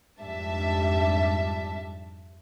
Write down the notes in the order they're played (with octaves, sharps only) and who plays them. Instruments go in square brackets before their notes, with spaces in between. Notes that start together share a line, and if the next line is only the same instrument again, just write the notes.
[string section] F2 G#2 G3 D4 E5 A5